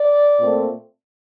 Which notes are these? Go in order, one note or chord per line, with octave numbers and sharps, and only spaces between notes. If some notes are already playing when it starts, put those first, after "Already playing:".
Already playing: D5
A#2 A3 C4